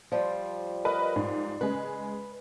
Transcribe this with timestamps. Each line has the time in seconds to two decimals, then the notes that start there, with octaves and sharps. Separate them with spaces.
0.12 F3 G3 C5
0.85 A#4 B4 D#5
1.16 G#2
1.61 C#3 G#3 B4